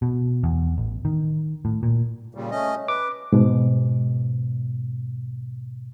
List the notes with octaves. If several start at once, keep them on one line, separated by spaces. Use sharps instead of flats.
B2
E2
A1
D#3
A2
A#2
A#2 C#3 G3
A3 C#4 D#5
B4 D6
G#2 B2